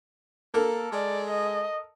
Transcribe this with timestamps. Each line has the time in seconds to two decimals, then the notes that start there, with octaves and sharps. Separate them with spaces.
0.54 A#3 A4 A#4
0.92 G#3 D5
1.30 D#5